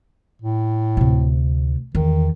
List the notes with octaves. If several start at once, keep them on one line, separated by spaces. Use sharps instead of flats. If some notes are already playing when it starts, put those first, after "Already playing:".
A2
D2 C3
E2 D#3